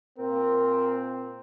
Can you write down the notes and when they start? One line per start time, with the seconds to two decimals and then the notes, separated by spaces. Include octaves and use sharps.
0.19 A#2 C4 A#4